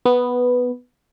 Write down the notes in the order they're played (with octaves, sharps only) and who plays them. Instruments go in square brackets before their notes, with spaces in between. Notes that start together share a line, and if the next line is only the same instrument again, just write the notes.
[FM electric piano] B3